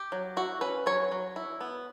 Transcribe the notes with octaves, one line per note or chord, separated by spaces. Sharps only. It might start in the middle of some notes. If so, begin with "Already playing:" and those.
Already playing: G4
F#3
E4 F#4
C#4 B4
F#3 C#5
F#3
E4
B3